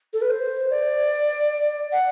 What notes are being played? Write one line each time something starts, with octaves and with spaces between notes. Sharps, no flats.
A4
B4
C5
D5
F#5